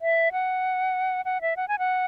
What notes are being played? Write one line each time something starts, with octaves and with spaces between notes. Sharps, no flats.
E5
F#5
F#5
E5
F#5
G#5
F#5